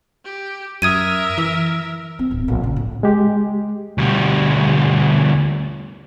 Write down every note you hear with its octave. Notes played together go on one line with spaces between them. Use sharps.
G4
F#2 A#4 E5 D#6 G#6 D#7
E3
C4
D1
A#1
C#3
A2
G#3 G4
D2 G3